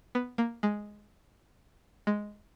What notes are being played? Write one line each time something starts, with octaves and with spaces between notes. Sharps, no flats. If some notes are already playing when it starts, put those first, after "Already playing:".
B3
A#3
G#3
G#3